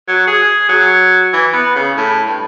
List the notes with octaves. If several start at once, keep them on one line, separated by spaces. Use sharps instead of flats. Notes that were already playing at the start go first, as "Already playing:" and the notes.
F#3
G#4
F#3
E3
B3
C#3
A2
G2